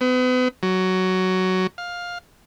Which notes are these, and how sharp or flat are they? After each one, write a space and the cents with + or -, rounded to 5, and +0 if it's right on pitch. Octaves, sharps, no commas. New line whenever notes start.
B3 +40
F#3 +10
F5 +15